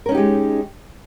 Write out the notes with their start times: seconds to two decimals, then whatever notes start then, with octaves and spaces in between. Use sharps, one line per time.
0.06 A#4
0.09 C#4
0.12 D#4
0.15 G4
0.18 G#3